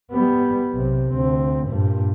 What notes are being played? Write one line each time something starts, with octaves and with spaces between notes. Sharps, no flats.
G3 B3
B1 C3
D2 C4
G2 A#2